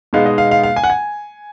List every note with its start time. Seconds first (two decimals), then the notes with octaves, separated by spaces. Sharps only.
0.13 B2 G#3 B3 D#4 F5
0.26 D#5
0.38 F5
0.51 F5
0.63 F5
0.76 G#5
0.84 F#5
0.90 G#5